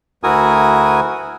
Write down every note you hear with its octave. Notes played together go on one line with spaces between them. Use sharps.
D2 E4 F#4 A#4 G#5 D#6